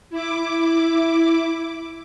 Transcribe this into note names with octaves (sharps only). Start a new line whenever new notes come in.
E4 D6